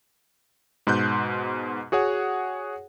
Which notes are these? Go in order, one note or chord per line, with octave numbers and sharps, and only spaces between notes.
G#2 B2 C6 F#6 G6
F#4 G#4 C#5 F#5